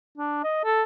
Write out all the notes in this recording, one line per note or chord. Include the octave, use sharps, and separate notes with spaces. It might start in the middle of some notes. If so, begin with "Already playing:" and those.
D4
D#5
A4